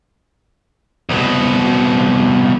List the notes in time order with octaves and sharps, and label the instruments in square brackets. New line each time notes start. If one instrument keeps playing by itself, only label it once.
[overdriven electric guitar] C2 B2